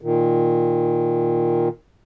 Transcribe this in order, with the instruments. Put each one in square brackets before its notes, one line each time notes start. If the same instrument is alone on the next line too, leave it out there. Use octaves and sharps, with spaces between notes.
[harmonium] A#2 D#3